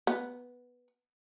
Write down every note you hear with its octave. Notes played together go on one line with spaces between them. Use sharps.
B3